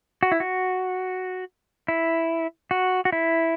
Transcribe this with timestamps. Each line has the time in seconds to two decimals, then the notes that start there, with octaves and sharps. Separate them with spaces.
0.23 F#4
0.32 E4
0.40 F#4
1.88 E4
2.71 F#4
3.05 F#4
3.12 E4